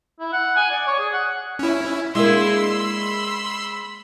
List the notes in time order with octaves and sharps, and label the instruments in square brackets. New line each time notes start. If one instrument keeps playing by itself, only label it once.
[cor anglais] E4
F#5
G#5
D5
C#5
G#4
F#5
[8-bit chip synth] C#4 E4
[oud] G#3 A#3 [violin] D4 E4 [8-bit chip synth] C6 E6
[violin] B5